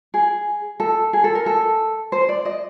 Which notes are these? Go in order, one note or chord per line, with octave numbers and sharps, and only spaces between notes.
G#4
A4
G#4
A4
A#4
A4
C5
D5
D#5